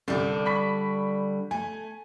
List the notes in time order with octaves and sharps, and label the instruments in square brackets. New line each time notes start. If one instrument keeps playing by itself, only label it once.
[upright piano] C2 [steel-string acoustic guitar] D3 G3 D4
[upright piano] B5 C#6 B6
[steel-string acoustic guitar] A3 [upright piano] G#5